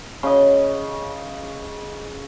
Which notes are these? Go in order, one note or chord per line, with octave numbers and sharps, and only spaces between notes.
C#3 D#5